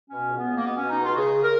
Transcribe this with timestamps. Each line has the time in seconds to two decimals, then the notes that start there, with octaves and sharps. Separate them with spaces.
0.10 B2 C#4
0.28 C#2
0.36 B3
0.45 C#2
0.55 A#3
0.63 B2 B3
0.76 B2 C#4
0.89 D#4
0.99 C#2 F4
1.12 F#4
1.16 C#3 G#4
1.43 A#4